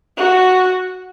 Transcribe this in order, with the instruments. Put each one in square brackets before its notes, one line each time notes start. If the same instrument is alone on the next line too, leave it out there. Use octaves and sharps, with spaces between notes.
[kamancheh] F#4